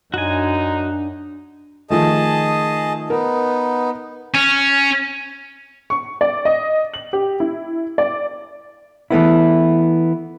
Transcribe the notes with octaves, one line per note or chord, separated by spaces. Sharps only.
F#2 D4 D#4 F#4 G#5
D#3 F3 A3 G#4 D#5 A5
B3 D#4 A#4
C#4
C#6
D5
D#5
F#7
G4
E4
D5
E3 A3 B3 E4